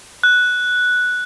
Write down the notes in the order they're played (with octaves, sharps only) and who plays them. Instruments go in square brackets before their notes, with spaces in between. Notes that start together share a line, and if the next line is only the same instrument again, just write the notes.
[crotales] F#6